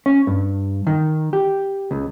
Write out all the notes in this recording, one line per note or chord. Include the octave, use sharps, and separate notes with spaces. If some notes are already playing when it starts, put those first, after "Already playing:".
C#4
G2
D#3
G4
C#2